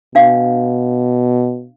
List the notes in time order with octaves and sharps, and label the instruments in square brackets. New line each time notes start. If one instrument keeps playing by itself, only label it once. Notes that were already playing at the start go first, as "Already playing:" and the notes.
[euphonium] B2 [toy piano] D4 F5